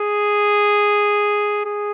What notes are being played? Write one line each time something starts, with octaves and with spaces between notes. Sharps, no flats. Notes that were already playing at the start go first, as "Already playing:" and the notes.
Already playing: G#4
G#4